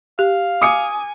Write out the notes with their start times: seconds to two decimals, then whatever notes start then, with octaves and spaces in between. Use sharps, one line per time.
0.19 G4 F5
0.62 G#5 D6 D#6 C#7